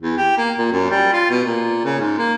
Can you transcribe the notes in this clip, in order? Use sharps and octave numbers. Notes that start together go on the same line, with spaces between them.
E2
G4
A#3
A#2
F#2
G3
F4
B2
A#2
C#3
G#2
A#3